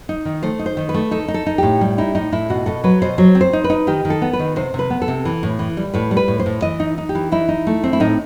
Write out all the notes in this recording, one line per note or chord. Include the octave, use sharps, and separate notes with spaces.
D#4
D#3
A3 C5
D#4
C5
D#3
B4
A3
D#4 A4
D#4
A4
D#4
A2 G4
G3
D#4 E4
A2 D#4
A2 E4
B2 F#4
B2 A4
F#3 B4
B2 C5
F#3 C5
C4
C5
D#4
B4
D#4
D#3 G4
D#3
A4
B3
B4
D#3
C3 C5
C3
B4
B3
A4
C3
E3
A2
E3
G3
A2 B4
G3
B4
A2
C5
A2
E3 D#5
D#4
D#4
G4
E3
D#4 E4
D#4
A3
C4
E4
A2 D#4